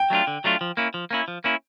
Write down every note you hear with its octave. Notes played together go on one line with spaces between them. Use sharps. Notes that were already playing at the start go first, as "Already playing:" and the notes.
Already playing: G5
F#3 A3 D4 F4
D3
F#3 A3 D4 F4
F3
A#3 C#4 E4
F3
A#3 C#4 E4
F3
A#3 C#4 E4